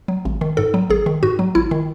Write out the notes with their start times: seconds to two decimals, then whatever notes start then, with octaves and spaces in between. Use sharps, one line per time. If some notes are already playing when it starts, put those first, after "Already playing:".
0.08 F#3
0.25 G#1
0.41 D#3
0.57 G#2 A4
0.74 F#3
0.90 G#1 G#4
1.06 D#3
1.23 G#2 F#4
1.39 F#3
1.55 G#1 E4
1.71 D#3